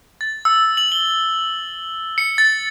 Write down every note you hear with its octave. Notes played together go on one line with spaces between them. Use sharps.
A6
E6
F#7
G7
C#7
A6